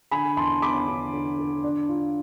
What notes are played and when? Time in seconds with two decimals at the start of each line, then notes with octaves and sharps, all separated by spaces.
0.11 D3 G#5 B5
0.37 E2 A5 C6
0.62 B3 B5 D6
0.87 D3
1.13 D3
1.38 D3
1.63 D4
1.89 F4